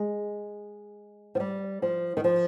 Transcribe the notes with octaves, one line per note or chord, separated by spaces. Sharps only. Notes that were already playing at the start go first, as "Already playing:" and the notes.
Already playing: G#3
F3
G3
F3
D#3
F3